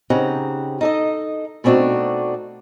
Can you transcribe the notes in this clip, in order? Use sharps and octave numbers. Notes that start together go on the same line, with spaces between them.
C#3 C4 D#4 G4 F#5 A#5
D#4 A4 D#5
B2 A3 C4 D4 D#4 F#4